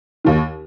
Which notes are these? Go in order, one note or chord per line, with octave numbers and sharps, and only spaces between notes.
D#2 D#3